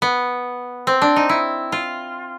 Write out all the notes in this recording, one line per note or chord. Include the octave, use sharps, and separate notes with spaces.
B3
C4
D4
D#4
E4
F4